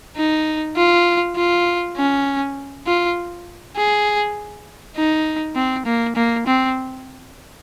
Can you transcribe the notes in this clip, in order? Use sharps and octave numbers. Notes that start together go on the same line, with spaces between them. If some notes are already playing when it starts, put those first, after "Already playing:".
D#4
F4
F4
C#4
F4
G#4
D#4
C4
A#3
A#3
C4